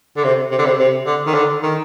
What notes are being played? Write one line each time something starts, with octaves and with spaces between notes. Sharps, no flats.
D3
C3
C3
D3
C3
C3
D3
D#3
D3
D#3